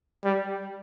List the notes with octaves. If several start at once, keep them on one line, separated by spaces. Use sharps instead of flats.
G3